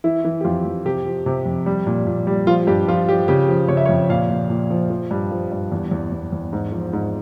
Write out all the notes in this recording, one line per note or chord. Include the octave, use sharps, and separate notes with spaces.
E3 E4
E3
G4
F2 F4
F2
C3 G4
F3
C3
F2
G3
A#2
A#2
G3
F3 F4
G2 G4
F3 F4
F3 G4
C#3 G4
F3
C#3 C#5
E5
C#5
F2
A#2 F5
A#2
A#2
F3
F3
G2
F3
G2
E2
E2
E2
E2
G#2
F3
G#2